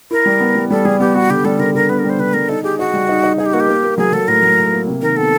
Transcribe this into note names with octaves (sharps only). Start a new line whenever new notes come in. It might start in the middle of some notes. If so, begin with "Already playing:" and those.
E4 A#4
G3
B3
G3
G3 A4
G3 G#4
B3 G4
B3 F#4
D3 G4
G3 A4
D3 A#4
D3 A#4
B3 B4
A#4
G3
C5
D3 B4
G3 A#4
D#4 A4
G4 G#4
D#4 F#4
G3
D#4
D#4
D#4 G#4
G4
A#3 F#4
G4
A#3
A#3
F#3 G#4
F#3 A4
A2 A#4
F#3
A2
A#3
C3
D#3 A#4
B3 A4